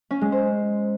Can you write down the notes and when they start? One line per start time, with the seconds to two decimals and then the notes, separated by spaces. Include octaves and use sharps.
0.10 C#4
0.21 G#3
0.32 C5